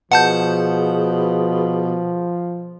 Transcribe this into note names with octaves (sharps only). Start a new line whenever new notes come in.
B2 F3 G#4 F#5 A5 G6